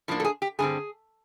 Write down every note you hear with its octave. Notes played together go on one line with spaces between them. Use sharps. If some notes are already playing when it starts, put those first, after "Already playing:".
A2 F3 A#3 D4
A4
G#4
G4
G2 D3 G3 C4 G#4